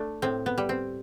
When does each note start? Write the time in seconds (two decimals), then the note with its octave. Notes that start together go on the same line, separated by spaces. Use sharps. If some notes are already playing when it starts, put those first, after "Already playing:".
Already playing: A3 D4
0.22 A2 C4
0.46 B3
0.58 G3
0.69 C4